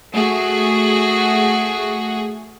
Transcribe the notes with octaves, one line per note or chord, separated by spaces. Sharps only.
A3 F#4 G#4